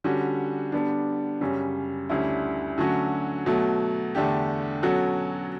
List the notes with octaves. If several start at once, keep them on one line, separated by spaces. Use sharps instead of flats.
D3 G3 C#4 F#4
D3 G3 B3 D4
F#2 C#3 G3 C#4
D2 D3 G3 C#4 E4
D3 F#3 A3 C#4 F#4
B2 F#3 A3
E2 D3 A3 D4 G4
B2 F#3 C#4 F#4 A4